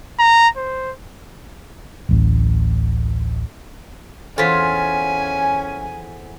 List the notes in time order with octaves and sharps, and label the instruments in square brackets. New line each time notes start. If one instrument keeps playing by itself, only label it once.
[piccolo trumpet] A#5
C5
[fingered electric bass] D1 A1
[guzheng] E2 F4 [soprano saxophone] C#4 [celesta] A4 C5 B6 [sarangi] G#5